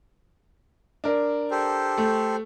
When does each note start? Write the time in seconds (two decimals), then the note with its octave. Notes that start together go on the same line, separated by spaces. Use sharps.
1.04 D4 A#4
1.51 G4 A4 C5
1.98 A3